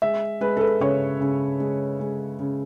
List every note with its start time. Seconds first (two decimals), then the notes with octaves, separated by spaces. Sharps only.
0.02 G#3 E5
0.41 G#3 B4
0.57 A4
0.61 B4
0.80 C#3 C#5
1.20 C#3
1.60 G#3
2.00 G#3
2.39 C#3